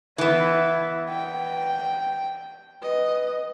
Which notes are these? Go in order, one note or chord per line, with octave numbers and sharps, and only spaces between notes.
E3 B3 E4
G5
B4 D#5